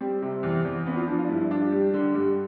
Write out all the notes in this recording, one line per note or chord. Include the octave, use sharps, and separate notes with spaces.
G3 C4
C3
E2
E2
B3 C4
F4
F3 D4
F4
D4
G2 E4
E4
D4 F4
G4
G3
D3
G2